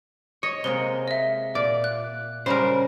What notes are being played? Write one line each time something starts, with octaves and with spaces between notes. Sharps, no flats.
C#5 D#5
C3 G#3 A#3 G7
D#5 E5
A#2 D5
F#6
C#3 G3 A#4 C5